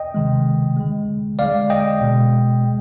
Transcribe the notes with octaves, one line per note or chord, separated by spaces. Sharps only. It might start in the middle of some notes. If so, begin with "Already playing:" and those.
Already playing: D#5 G5
C3 D#3 G#3
D3 G#3
D3 G#3 D5 F5
D#5 G5
B2 G#3
G#3